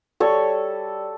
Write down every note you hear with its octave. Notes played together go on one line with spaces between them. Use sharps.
G3 A4 C#5